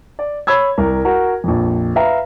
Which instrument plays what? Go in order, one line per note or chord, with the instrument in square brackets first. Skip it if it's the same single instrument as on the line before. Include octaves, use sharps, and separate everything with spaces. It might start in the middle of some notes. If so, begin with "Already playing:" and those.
[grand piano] D5
C#5 B5 E6 G#6
C2 A#4
F#4 A#4
A#1 F2
B4 E5 F5 A#5